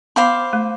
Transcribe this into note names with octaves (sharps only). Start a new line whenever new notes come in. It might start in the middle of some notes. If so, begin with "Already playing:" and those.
B3 C5 F5 B5 D6
A3